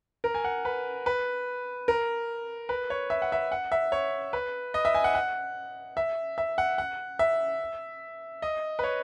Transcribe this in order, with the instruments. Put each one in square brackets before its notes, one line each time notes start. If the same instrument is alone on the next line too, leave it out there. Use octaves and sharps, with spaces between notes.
[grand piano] A#4
G#5
F#5
B4
B4
A#4
B4
C#5
E5
F#5
E5
F#5
E5
C#5
B4
D#5
E5
G#5
F#5
F#5
E5
E5
F#5
F#5
E5
D#5
B4
C#5